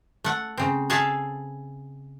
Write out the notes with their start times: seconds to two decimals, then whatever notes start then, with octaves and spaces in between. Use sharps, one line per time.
0.24 A3 F#5
0.57 C#3 C4
0.90 G#4 A4 E5 F5 A5